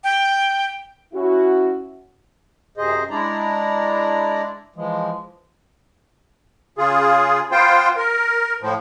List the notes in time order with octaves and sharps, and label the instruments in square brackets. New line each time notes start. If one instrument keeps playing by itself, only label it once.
[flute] G5
[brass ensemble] C#4 E4 F#4
[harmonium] F#2 C3 G#4 C5 D#5
G#3 D4 E4 D5 A#5
E3 F3 G#3
[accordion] C#3 F4 G#4
B3 F4 C5 G5
A#4
A2 F3